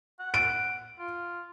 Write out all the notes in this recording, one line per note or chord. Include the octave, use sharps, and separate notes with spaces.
F#5
D7
F4